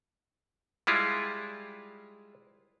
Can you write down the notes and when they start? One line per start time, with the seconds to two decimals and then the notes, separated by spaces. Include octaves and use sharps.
0.87 G3 G#3 E4 F4